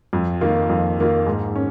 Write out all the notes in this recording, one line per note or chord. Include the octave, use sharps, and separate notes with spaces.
F2
D#3 A#3 F4
F2
D#3 A#3 F4
G#2
C#4